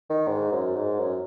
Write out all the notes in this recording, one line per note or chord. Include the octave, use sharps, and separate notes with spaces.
D#3
G#2
F#2
G#2
F#2